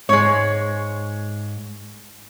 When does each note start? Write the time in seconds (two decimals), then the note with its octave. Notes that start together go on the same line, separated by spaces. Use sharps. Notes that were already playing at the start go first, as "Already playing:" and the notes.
0.09 G#2 G#3 C#5